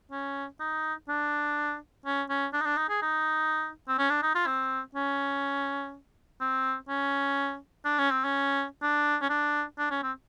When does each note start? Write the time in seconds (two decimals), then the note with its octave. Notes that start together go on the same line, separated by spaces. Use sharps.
0.12 C#4
0.60 D#4
1.09 D4
2.06 C#4
2.30 C#4
2.53 D4
2.61 D#4
2.66 D4
2.77 D#4
2.89 G#4
3.02 D#4
3.89 C4
3.98 C#4
4.10 D4
4.23 D#4
4.35 F4
4.47 C4
4.95 C#4
6.41 C4
6.89 C#4
7.85 D4
7.99 C#4
8.11 C4
8.25 C#4
8.83 D4
9.22 C#4
9.30 D4
9.78 D4
9.91 C#4
10.03 C4